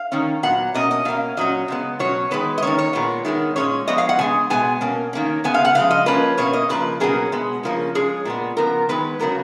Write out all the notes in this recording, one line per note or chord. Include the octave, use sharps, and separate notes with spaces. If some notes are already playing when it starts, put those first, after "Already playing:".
Already playing: F5
D#3 A#3 C#4
A#2 F#3 B3 F#5
B2 A#3 C#4 D#5
D#5
B2 A#3 C#4 F5
A#2 F#3 C#4 D#5
C#3 G#3 B3
B2 F#3 C#4 C#5
D#3 G#3 B3 B4
D#5
D#3 A#3 C#4 C#5
C#5
A#2 G#3 B3
D#3 G#3 B3
A#2 G#3 C#4 C#5
F3 G#3 B3 D#5
F5
F#5
C#3 G#3 B3 G#5
B2 G#3 B3 G#5
B2 A#3 C#4
D#3 A#3 C#4
C#3 G#3 B3 G#5
F5
F#5
C#3 F3 G#3 F5
D#5
F3 A#3 C#4 B4
B2 A#3 C#4 C#5
D#5
C#3 F3 A#3 B4
B2 F#3 A#3 C#4 G#4
B2 G#3 B3
C#3 F3 A#3 C#4
F3 G#3 C#4 G#4
A#2 G#3 B3
C#3 F3 B3 A#4
D#3 G#3 B3 B4
C#3 F#3 B3 A#4